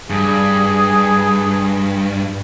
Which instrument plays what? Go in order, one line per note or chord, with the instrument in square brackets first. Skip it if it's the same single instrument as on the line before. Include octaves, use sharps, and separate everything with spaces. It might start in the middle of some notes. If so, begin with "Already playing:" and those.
[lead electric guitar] G2 [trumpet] G#4